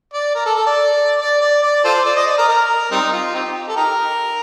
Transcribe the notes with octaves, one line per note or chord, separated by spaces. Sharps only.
D5
A#4
A4
A4
D5
D5
D5
D5
F4 A4 C5
D5
D#5
D5
A#4
A#4
G3 C4 D#4
F4
C4 D#4 G4
A4
D#4 G4 A#4